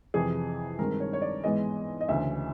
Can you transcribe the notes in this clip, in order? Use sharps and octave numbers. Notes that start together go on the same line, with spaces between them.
F2 C3 E3 G#4
G2 D#3 G#3 C4 A#4
C#5
C#5
D5
G#2 E3 G#3 B3 D#5
D#5
D2 C#3 E3 E5